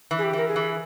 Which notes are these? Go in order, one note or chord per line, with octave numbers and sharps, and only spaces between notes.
E3
G#4
G4
E3 A#4
G#4
E3